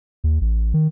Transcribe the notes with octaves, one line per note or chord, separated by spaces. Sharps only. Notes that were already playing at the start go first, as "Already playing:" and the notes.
D#2
A1
D#3